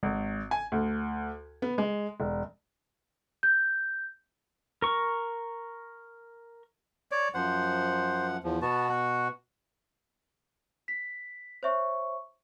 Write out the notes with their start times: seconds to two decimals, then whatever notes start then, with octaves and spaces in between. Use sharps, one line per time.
0.03 G#1
0.51 G#5
0.72 D2
1.62 B3
1.78 G#3
2.20 E1
3.43 G6
4.82 A#4 C#6
7.11 C#5 D5
7.34 F#2 F3 C5 F#5
8.44 E2 F3
8.62 B2 B3 F#4 A5
8.89 F#5
10.88 B6
11.63 C5 C#5 E5 C#6